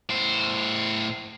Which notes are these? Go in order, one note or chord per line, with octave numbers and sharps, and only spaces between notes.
A2 C5